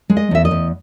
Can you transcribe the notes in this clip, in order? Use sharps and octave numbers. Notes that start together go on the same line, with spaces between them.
G#3
D#5
E2 E5
D#5
E2